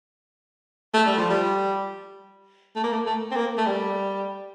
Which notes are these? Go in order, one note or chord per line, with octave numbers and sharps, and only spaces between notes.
A3
G3
F3
G3
A3
A#3
A3
A3
C4
A#3
A3
G3